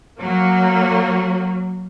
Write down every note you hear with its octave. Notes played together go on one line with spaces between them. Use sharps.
F#3 A#3